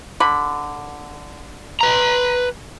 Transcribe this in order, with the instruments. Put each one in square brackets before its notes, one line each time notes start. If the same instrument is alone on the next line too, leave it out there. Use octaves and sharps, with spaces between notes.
[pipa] D3 B5
[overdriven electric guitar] B4 A#5